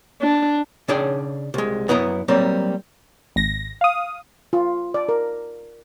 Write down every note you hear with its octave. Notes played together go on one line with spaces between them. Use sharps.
D4
C#3 C#4 D4 G#4 D5 G5
C2 G#3
F#2 B3 E4 D#5 A#5
F#3 G3 A#3 C4
G#1 A#6
F5 D#6
F4
D5
A#4